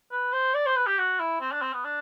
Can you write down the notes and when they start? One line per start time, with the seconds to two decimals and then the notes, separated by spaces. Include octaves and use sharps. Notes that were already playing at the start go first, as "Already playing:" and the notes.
0.11 B4
0.33 C5
0.54 D5
0.66 C5
0.76 B4
0.87 G4
0.98 F#4
1.20 E4
1.41 C4
1.52 D4
1.62 C4
1.73 B3
1.85 D4